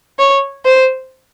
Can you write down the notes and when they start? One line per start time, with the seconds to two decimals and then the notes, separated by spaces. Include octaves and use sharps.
0.19 C#5
0.65 C5